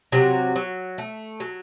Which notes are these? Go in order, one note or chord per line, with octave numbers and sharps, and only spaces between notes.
C3 F#3 F#4
F#3
A3
F#3